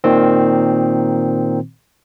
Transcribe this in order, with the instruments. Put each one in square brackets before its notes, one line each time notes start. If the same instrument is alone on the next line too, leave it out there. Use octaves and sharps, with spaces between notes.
[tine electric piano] A#2 D#3 C4